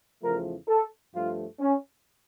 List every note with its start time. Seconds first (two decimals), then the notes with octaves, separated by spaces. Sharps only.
0.22 E2 C#3 F3 A3 A#4
0.68 A4
1.14 G2 F3 A3 F4
1.60 C#4